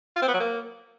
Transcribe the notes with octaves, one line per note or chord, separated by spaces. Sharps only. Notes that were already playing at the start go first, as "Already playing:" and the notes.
F4
C4
B3
F#3
A#3